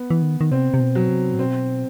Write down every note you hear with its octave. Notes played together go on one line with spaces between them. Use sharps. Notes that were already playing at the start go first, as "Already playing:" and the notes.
Already playing: B3
E3
D#3
D#3
C3 C4
C3
B2
F#3
C3
A2
B2 C4